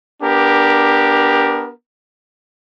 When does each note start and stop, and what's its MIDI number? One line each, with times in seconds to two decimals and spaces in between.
0.23 1.71 59
0.23 1.71 62
0.23 1.71 67
0.23 1.71 70